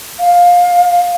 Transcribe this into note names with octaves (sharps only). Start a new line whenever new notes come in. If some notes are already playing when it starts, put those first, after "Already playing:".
F5